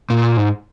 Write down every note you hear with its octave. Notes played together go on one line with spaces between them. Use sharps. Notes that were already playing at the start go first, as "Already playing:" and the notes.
A#2
G#2